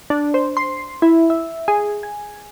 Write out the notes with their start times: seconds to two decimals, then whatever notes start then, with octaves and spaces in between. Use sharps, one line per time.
0.10 D4
0.34 C5
0.57 C6
1.02 E4
1.30 E5
1.68 G#4
2.03 G#5